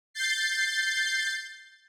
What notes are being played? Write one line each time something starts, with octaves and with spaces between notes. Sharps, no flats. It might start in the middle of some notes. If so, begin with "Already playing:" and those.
G6 A6 C7